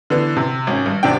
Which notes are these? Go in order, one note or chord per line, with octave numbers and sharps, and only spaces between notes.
D3 E3 B3
C3
G#1 C#4
G2
D#1 C3 D4 G5